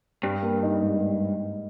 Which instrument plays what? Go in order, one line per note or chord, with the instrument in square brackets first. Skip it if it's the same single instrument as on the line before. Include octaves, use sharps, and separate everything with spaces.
[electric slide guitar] G2 [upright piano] G3
[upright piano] A#3
D#4
G#2